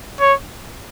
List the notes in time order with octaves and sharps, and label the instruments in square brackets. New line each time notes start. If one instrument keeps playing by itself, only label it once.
[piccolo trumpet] C#5